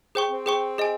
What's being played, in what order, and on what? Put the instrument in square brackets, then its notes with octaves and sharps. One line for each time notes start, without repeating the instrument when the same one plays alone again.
[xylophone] G#4 C5 G5 C#6
[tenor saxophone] C4
[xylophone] G#4 C5 G5 C#6
G#4 D#5 G#5